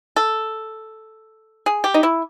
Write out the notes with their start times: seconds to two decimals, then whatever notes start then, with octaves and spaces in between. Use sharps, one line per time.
0.16 A4
1.66 G#4
1.84 G4
1.94 D#4
2.03 E4